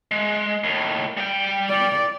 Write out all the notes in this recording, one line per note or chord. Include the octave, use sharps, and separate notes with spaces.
G#3
D#2 A2
G3 G5
D5